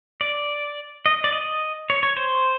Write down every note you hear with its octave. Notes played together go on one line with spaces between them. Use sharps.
D5
D#5
D5
D#5
C#5
C#5
C5